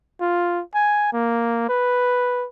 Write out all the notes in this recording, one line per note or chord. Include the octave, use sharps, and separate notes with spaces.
F4
G#5
A#3
B4